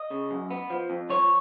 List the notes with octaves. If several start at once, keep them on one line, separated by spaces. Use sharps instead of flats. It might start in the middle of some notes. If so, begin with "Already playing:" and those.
Already playing: D#5
C#3
F#2
B3
F3
F2
F3 C#5